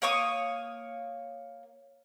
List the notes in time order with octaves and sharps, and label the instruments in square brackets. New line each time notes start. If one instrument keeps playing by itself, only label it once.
[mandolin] A#3 C#5 C#6 D#6